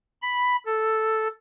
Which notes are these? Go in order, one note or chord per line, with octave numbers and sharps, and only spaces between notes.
B5
A4